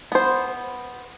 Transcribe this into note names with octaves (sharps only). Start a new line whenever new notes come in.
B3 C5